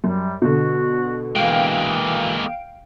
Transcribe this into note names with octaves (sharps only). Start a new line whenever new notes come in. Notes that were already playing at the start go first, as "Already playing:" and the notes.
F#2 G3
B2 D3 F#4
E3 G#3 A#3 F5 G5 D7